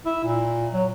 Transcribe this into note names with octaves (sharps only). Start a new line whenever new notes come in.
E4
A#2
F#3